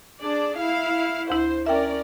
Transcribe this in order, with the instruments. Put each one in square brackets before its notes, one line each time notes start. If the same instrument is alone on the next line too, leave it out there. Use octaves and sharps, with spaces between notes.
[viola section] D4 G#4 D5
E4 F5
[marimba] D2 E4 [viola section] C5
[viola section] C#4 A#4 D5 [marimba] E5 G5